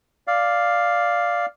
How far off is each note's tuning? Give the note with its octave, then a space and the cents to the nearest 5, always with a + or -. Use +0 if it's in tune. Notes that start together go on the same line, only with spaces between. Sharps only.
D5 +0 F5 +0